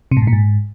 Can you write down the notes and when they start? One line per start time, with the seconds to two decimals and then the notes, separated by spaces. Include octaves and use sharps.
0.11 C3
0.17 A2
0.22 G#2
0.27 A#2
0.33 G#2